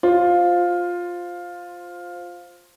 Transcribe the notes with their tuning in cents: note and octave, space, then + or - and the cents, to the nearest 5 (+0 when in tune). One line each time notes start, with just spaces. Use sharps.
F4 +10 C5 +0